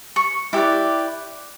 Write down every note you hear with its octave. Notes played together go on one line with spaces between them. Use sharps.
C#6
E4 G4 B4 D5